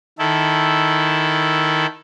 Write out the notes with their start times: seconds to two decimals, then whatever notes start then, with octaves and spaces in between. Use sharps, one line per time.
0.19 D#3 E4 A4